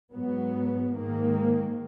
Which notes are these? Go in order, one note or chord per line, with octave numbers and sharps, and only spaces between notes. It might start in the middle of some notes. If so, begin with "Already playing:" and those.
G#2 F#3 B3
G#2 D#3 A#3